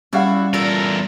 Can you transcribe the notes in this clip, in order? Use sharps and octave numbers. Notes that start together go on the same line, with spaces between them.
G3 C#4 E4 F#4 F5 F#5
E2 A#2 F4 A4 A#4